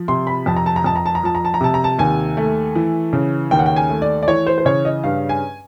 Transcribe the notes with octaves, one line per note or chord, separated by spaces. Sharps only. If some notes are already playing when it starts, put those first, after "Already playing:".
Already playing: F3
C3 C6
B5
F2 A5
A#5
A5
A#5
F2 A5
A#5
A5
A#5
F3 A5
A#5
A5
A#5
C3 A5
A#5
A5
D#2 G#5
A3
E3
C#3
D#2 G5
F#5
G5
G#5
A3
D5
D5
E3 C#5
C5
C5
C#3 C#5
D#5
G2 F5
G#5